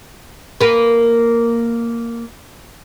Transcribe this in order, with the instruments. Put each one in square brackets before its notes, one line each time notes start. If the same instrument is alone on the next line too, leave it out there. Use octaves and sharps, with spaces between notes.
[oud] A#3 B4